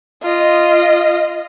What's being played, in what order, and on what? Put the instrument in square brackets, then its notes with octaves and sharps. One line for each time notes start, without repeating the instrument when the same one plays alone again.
[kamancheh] F4 D#5